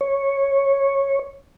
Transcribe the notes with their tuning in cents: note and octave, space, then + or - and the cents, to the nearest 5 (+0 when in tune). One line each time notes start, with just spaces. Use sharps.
C#5 -10